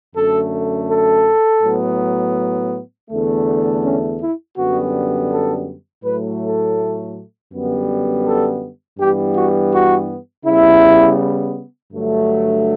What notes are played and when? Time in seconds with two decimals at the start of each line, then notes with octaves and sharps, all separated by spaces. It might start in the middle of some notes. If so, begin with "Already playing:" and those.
0.16 F#2 D3 A3 A4
0.89 A4
1.63 A2 F#3 B3
3.10 E2 D3 A3
3.84 C#4
4.21 E4
4.57 F#2 D3 G3 B3 F#4
5.31 A4
6.05 A2 F#3 A3 B4
6.41 A4
7.52 F#2 D3 G3 B3
8.25 A4
8.99 G2 E3 G3 B3 G4
9.36 F#4
9.73 F#4
10.46 C#3 G3 B3 E4
11.93 G2 D3 F#3 A3